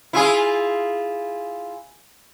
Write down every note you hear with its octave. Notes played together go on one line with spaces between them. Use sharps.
E4 F4 G#4